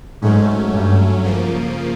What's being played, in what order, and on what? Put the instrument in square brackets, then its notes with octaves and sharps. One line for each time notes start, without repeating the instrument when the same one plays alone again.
[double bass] G#2 [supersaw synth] F#3 A3 C#4
[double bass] G2
[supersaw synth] C#3 F3 A#3